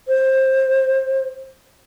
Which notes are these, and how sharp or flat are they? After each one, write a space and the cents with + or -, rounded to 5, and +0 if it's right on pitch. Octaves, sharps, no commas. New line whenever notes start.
C5 +20